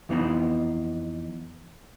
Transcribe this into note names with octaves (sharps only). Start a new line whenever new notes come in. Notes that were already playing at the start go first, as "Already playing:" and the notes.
F2 E3 B3 D#4 C5 B5